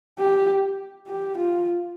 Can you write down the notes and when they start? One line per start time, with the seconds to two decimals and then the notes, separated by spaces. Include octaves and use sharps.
0.19 G4
1.08 G4
1.37 F4